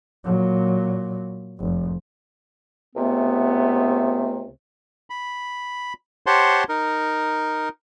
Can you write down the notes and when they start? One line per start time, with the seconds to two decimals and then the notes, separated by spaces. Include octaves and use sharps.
0.24 A#2 F#3
1.60 F1
2.96 C#2 C3 A3 B3
5.10 B5
6.26 G4 C5 C#5 F#5 A5 C6
6.69 D#4 A#4